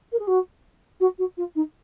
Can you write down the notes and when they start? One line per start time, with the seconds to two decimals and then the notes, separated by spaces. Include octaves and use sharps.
0.12 A#4
0.19 G#4
0.27 F#4
1.00 F#4
1.18 F#4
1.37 F4
1.55 D#4